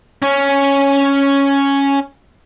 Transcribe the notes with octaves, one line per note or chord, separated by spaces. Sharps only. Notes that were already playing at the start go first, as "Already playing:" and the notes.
C#4 C#5